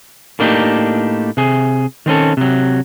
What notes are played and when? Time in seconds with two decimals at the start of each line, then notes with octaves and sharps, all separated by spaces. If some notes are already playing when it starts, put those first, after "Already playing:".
0.39 A2 A#3 D4 D#4 F#4 G4
1.37 C3 G#4
2.06 D#3 C4 C#4 A4
2.37 C3 F#3